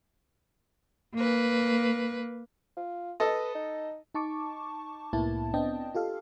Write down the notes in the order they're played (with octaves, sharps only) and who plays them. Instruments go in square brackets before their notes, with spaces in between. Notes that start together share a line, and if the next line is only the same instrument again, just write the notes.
[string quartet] A#3 B4
[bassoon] F4
[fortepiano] A4 D#5 [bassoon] B4
[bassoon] D#4
[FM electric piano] D#4 A5 C#6 D6
C2 A2 A#3 B3 E4 A5
B3 C4 D4 D#5 G5 A5
F4 G4 A4 F5